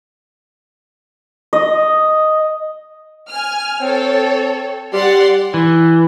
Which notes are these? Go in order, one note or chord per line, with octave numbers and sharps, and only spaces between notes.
D#5
G#5 F6
C4 A4 C#5
G3 D5 F#5 C6
E3